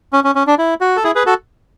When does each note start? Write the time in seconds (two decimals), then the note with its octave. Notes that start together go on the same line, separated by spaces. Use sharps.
0.13 C#4
0.24 C#4
0.35 C#4
0.47 D4
0.58 E4
0.81 F#4
0.96 A4
1.04 E4 G#4
1.15 G#4 B4
1.26 F#4 A4